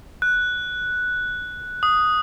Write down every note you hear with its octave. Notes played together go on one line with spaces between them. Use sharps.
F#6
D#6